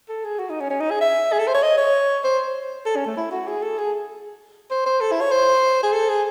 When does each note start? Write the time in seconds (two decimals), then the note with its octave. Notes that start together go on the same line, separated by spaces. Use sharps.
0.09 A4
0.24 G#4
0.39 F#4
0.50 D#4
0.60 C#4
0.70 C#4
0.80 D#4
0.91 G#4
1.01 E5
1.32 G#4
1.39 A4
1.47 C5
1.54 C#5
1.63 D#5
1.77 C#5
2.24 C5
2.86 A4
2.96 C#4
3.06 A3
3.17 E4
3.31 F#4
3.48 G#4
3.62 A4
3.78 G#4
4.71 C5
4.86 C5
5.01 A4
5.12 E4
5.21 C#5
5.31 C5
5.83 G#4
5.93 A4
6.09 G#4